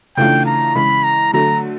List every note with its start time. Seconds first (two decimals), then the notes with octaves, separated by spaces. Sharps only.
0.17 C#3 E3 A3 D4 F4 G5
0.46 A#5
0.75 C#3 E3 G#3 B5
1.04 A#5
1.33 D3 F#3 A3 A#5